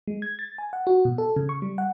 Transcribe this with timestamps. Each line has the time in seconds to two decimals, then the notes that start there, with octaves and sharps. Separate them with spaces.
0.07 G#3
0.22 G#6
0.39 A6
0.58 G#5
0.73 F#5
0.87 F#4
1.05 B2
1.18 A4
1.36 C#3
1.49 C#6
1.62 G3
1.78 F#5